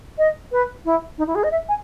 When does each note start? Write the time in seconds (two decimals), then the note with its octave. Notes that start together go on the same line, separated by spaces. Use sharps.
0.18 D#5
0.52 B4
0.85 E4
1.18 D#4
1.27 E4
1.35 G#4
1.44 D#5
1.51 E5
1.69 G#5